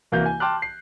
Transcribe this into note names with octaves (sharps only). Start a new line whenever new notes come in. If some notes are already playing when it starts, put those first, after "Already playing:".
C2 E3 A#3 F#4 F5 G6
G#5
G5 A5 C6 D6 F6 F#6
C7